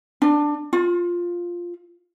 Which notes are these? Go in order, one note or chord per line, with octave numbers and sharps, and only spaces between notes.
D4
F4